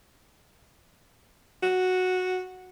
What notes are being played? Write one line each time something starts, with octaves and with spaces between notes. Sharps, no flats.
F#4